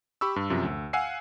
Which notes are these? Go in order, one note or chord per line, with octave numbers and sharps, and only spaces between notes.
G4 B5 C#6 E6
G2
F#2 C3 F3
D2
F5 F#5 G#5 E6 C7